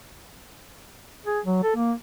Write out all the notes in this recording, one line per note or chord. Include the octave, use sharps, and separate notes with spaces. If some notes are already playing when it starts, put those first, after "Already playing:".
G#4
F#3
A4
A#3